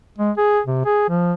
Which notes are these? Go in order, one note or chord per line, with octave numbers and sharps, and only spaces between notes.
G#3
G#4
C3
G#4
F3